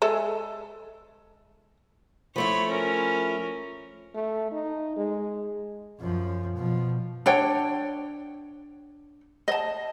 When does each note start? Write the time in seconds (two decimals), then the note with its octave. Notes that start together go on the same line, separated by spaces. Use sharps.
0.02 G#3 A4 E5
2.36 F3 A3 E4 C#5 B5
2.69 C#4 A#4
4.14 A3
4.52 D#4
4.96 G#3
6.00 F#2 F3
6.56 B2 F3
7.26 D4 C#5 G5
9.48 D#5 A5